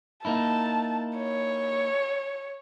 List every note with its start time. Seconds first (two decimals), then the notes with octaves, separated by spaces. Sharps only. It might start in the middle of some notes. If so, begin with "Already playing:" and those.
0.25 A#3 D#4 E4 A5
1.18 C#5